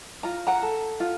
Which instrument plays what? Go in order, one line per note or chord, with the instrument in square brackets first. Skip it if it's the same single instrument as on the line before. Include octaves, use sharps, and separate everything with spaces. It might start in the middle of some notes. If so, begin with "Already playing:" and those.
[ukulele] F4 A#5
F#5 A#5
A4
F4